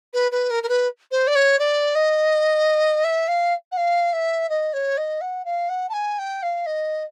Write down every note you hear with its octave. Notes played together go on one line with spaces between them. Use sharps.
B4
B4
A#4
A#4
B4
C5
D5
C#5
D5
D#5
E5
F5
F#5
F5
E5
D#5
C#5
D#5
F#5
F5
F#5
A5
G#5
G5
F5
D#5